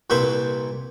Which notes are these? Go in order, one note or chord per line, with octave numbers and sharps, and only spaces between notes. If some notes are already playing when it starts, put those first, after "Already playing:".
C2 A#2 B4 C5 E5 C#6